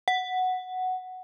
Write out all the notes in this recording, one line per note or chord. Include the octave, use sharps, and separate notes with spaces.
F#5